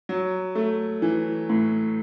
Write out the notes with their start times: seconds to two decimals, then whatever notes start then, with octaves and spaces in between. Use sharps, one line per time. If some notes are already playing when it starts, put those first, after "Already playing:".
0.09 F#3
0.55 A3
1.02 E3
1.50 A2